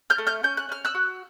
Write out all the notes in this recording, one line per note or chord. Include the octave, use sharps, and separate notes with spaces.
F6 G6
A3
F6 G6
C#4 G6
F#6
C#4 F6
E6 F#6
F#4